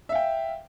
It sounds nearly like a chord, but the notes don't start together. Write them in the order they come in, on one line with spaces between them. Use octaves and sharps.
E5 F5 G5